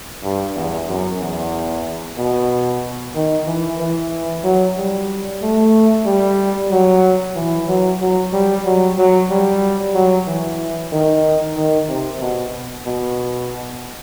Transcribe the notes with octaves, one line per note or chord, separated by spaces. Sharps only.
G2
E2
F#2
E2
B2
D#3
E3
E3
F#3
G3
A3
G3
F#3
E3
F#3
F#3
G3
F#3
F#3
G3
F#3
E3
D#3
D#3
C3
B2
B2